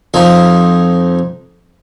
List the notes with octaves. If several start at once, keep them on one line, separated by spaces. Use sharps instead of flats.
F2 F3 D#4